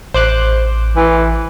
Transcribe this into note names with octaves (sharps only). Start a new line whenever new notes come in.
A1 C5 D6 F#6
E3